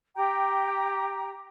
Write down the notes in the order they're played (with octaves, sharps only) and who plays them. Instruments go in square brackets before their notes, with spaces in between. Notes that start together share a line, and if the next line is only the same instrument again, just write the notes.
[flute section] G4 G5 A#5